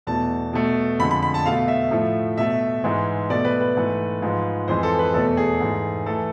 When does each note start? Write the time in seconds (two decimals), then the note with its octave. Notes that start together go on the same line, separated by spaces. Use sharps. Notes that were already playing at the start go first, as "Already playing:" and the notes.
0.07 E2 B2 A3 A5
0.53 B2 A3
0.99 F2 D3 G#3 B5
1.11 B5
1.22 B5
1.34 A5
1.46 B2 A3 F5
1.68 E5
1.91 A2 F3 A3
2.37 B2 A3 E5
2.84 G#2 E3 G#3
3.30 B2 A3 D5
3.45 B4
3.61 B4
3.76 G#2 E3 A3
4.22 G#2 F3 G#3
4.68 F2 E3 G#3 C5
4.83 A4
4.99 B4
5.14 E2 B2 A3 A4
5.37 G#4
5.60 G#2 E3 A3
6.06 E3 A3 A4